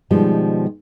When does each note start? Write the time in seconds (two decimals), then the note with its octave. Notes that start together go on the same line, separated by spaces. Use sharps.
0.11 B2 D#3 F3 G3 G#3